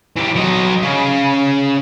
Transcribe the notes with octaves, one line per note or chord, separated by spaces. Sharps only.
E3 G4
F#3 D#5
C#3 C#4